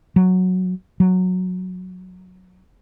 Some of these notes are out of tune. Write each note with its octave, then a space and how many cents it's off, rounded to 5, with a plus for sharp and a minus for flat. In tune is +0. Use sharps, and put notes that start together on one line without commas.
F#3 -5
F#3 -10